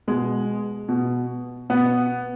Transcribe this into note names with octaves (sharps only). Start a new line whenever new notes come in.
B2 G#3
B2
B2 B3